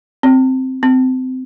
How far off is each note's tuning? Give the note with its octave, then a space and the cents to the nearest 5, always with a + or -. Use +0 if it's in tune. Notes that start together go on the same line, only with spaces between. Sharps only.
C4 -5
C4 -25